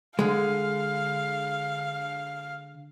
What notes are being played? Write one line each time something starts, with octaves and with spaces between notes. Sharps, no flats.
D3 G#3 F5